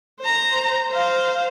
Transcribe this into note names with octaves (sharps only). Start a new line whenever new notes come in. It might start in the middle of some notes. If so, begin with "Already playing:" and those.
C5 A#5
C5 F5